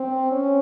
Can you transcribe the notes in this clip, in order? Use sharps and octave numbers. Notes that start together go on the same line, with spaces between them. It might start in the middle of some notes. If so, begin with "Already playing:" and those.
Already playing: C4
C#4